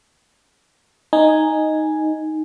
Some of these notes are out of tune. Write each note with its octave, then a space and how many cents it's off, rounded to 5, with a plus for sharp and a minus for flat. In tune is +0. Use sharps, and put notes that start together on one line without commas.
D#4 +0 G#5 +0